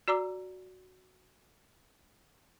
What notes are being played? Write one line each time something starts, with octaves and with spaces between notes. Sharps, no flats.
F#4 D5 A#5 D6 E6